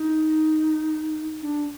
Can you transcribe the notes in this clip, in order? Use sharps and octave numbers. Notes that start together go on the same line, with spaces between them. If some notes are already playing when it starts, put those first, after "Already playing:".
Already playing: D#4
D4